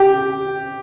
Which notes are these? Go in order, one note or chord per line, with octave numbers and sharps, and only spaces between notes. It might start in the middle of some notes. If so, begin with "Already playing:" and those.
Already playing: G4